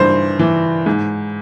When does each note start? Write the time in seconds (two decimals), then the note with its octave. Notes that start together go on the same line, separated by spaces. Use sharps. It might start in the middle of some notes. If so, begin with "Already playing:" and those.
Already playing: G2 E3 C5
0.39 E3
0.86 G#2